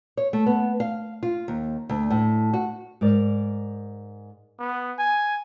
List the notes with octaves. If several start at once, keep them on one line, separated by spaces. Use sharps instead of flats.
C#5
A3
B3
F5
F4
D#2
D2
A2
F#4
G#2 A#4 D5
B3
G#5